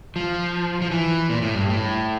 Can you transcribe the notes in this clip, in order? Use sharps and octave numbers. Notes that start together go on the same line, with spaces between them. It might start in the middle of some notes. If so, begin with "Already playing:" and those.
F3
F3
E3
A#2
A2
G2
A2